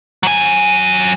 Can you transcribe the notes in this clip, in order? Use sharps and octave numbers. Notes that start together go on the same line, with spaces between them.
F#3 G#5